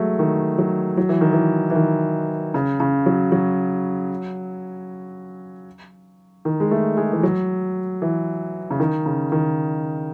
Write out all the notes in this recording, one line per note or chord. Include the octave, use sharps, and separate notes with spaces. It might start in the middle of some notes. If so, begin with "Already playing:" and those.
Already playing: F#3 G#3 A3
D#3
F#3
F#3
E3
D#3
E3
E3
D#3
C#3
C#3
F#3
F#3
D#3
G#3
A3
G#3
E3
F#3
E3
C#3
D#3
C#3
D#3